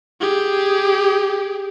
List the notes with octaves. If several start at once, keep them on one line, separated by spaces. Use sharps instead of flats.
G4 G#4